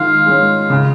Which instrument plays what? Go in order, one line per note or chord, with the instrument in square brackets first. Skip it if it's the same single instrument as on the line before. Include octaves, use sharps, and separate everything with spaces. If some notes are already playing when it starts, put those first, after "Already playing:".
Already playing: [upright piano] D#3 G#3 [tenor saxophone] F4
[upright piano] G#3 C#4
C#3